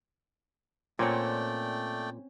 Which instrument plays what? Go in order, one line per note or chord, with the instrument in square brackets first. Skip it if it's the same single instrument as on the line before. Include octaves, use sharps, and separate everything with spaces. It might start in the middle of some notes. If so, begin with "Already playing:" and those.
[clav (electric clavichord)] A#2 [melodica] A3 D5 G5 [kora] C4 C#4 F#5